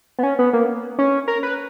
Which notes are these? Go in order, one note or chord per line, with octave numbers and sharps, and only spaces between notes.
B3
C#4
B3
A#3
C#4
A#4
B4